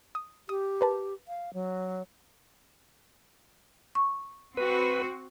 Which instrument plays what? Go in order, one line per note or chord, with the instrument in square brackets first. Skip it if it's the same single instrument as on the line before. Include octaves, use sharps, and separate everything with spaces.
[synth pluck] D#6
[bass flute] G4 [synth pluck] D#6
[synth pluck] A#4 B4 A5
[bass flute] F5
F#3
[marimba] C#6
[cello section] C4 F#4 [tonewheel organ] B4